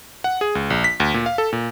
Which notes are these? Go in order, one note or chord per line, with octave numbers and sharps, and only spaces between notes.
F#5
G#4
C#2
A#1
B6
D2
A#2
F5
A4
A#2